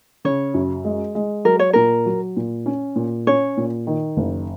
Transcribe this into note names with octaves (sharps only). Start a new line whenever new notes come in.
C#3 C#5
F#2
G#3
G#3
F#3 A#4
C#5
A#2 A#4
F#3
A#2
C#4
A#2
C#4 C#5
A#2
D#3
F#1